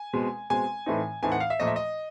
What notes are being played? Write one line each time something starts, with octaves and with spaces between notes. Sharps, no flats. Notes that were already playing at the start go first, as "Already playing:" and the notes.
Already playing: G#5
B2 G#3 C4
B2 G#3 C4 G#5
A2 E3 A3 C4 D#4
A2 E3 A3 C4 D#4 G#5
F#5
F5
E5
A#2 F3 A3 D#5
E5
D#5